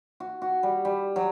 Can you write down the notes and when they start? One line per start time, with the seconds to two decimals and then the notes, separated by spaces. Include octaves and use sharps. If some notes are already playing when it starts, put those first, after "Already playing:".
0.20 F#4
0.42 F#4
0.63 G3
0.85 G3
1.16 F#3